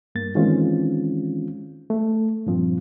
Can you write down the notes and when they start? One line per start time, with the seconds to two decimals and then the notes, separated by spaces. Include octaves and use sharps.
0.15 G2 A#3 A6
0.35 D#3 E3 G#3 C4 C#4 F4
1.90 A3
2.46 G2 A#2 F3 C4